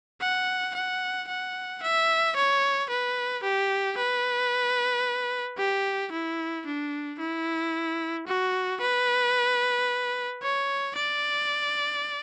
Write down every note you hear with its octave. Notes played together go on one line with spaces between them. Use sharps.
F#5
F#5
F#5
E5
C#5
B4
G4
B4
G4
E4
D4
E4
F#4
B4
C#5
D5